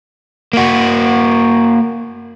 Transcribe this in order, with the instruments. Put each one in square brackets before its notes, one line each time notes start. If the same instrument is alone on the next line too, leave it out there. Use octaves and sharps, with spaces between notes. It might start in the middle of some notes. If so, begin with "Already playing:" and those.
[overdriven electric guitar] A#3 F#4